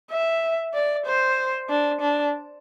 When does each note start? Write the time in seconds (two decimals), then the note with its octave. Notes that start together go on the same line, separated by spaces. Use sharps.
0.11 E5
0.74 D5
1.06 C5
1.69 D4
2.01 D4